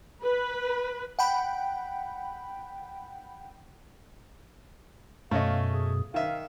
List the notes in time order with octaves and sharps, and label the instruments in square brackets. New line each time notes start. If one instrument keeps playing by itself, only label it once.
[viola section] B4
[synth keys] F#5 G5 B5
[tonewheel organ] F#2 B2 [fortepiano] A3 C#4 D#5 [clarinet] F5
[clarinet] G#4
[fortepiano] D#3 E5 [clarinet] F5